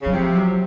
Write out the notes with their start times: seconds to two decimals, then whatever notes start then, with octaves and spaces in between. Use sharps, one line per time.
0.01 C#3 F#3
0.13 C3 F3
0.35 F#3